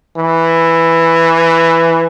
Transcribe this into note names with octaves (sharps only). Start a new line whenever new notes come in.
E3